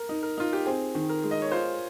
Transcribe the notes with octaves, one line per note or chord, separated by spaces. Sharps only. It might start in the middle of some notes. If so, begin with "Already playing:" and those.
Already playing: A#4
D#4
A#4
D#4 F4
G4
C4 G#4
D#3
A#4
G#3
D#5
C#5
F4 C5